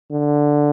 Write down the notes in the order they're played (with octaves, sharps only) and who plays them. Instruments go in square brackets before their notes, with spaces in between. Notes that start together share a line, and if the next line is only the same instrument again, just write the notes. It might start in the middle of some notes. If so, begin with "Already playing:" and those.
[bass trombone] D3